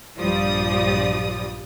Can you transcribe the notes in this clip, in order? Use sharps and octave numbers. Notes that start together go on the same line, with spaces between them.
A#1 G2 F3 G3 D5 D#6